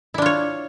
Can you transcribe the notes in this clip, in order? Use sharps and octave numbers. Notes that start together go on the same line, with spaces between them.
D4 E4 F4 C#5